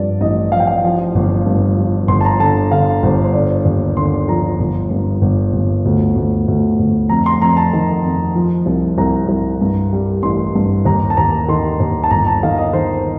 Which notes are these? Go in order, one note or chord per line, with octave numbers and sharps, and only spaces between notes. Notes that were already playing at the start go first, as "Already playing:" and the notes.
Already playing: G2 F3 D5
A1 D#5
F3 F5
G5
F5
F3
G1
G2
F3
G1 C6
A5
A#5
D3 A5
D3 F5
G1 C5
C5
D3 D5
D#2
D3 C6
F3 A#5
G1
G2
G1
G1
D2
D2
D2
D2
F2 A#5
C6
F2 A#5
A5
D#3
F2
F3
C2
C2 A#5
C2
G2
G3
A1 C6
G2
D#2 A#5
A5
D#2 A#5
D#3 C6
D#2
A5
G1 A#5
A5
D#3 F5
D#5
D#3 C5